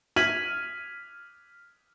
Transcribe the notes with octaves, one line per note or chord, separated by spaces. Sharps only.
F6 G#6 B6 D#7 F#7